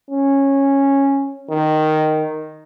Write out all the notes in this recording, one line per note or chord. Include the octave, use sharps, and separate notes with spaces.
C#4
D#3